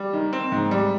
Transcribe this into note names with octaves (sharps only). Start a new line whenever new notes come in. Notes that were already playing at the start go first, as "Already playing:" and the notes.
Already playing: G3
D#3
C4
G#2
G3